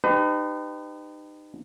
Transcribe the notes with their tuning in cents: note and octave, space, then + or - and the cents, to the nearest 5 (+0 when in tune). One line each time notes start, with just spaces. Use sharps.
D#4 -30 G4 +0 B4 +35